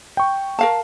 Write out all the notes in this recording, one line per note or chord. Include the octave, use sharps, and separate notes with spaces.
G5 C#6
A#4 F5 A5